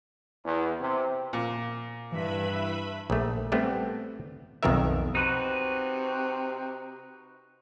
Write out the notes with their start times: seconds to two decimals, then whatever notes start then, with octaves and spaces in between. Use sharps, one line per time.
0.45 E2
0.80 C3
1.33 A#2
2.12 G2 E3 B4 E5 B5
3.10 A#1 A3
3.52 G3 A3 B3 C4
4.63 B1 F2 D#3 B3 A#4 E5
5.15 C3 D#4 F#4 B4